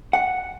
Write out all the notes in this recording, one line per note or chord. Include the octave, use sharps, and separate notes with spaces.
F#5